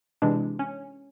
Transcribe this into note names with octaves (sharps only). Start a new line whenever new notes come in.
C3 E3 G#3 D4
C#4